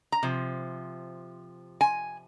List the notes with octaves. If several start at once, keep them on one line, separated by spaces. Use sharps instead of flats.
A#5
C3 F3
G#5